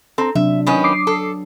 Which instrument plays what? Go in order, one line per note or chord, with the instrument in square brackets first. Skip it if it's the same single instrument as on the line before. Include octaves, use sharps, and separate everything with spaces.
[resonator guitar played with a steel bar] C4 [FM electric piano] A4 A#5
[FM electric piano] C3 [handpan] F#3 D4 [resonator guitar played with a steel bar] E5
[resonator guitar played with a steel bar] D#3 B3 C#4
[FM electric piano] D6 D#6 C7
[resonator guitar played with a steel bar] A4